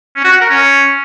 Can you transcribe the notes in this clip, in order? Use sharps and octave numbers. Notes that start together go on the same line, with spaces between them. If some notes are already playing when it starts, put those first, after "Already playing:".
C#4
F#4
F#5
A#4
C#4